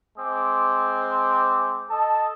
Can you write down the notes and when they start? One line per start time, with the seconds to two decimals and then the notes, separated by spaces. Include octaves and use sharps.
0.18 G#3 C4 D6
1.90 A4 D#5 A5